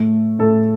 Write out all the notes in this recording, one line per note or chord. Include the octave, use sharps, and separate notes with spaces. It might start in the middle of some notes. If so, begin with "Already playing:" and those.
Already playing: A2 A3
A2 A3 A4